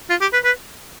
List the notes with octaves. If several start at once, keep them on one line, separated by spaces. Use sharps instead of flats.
F4
G4
B4
B4